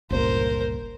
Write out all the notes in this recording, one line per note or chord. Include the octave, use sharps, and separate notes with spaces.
G1 C#2 A#2 A#4 C5